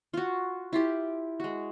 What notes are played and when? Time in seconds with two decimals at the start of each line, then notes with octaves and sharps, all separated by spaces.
0.14 F4 F#4
0.73 E4 F4 G4
1.40 G#3 F#4